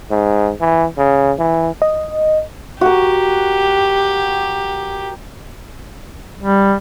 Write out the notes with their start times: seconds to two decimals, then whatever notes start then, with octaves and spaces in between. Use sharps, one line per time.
0.10 G#2
0.60 E3
0.98 C#3
1.38 E3
1.82 D#5
2.81 F#4 G4 A#4
6.39 G3